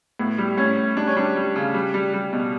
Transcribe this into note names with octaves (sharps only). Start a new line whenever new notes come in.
A2 B3
G3
A2 C#4
A2
G3 D4
C#4
G3 D4
G3
C#3
G3
G3
G3
B2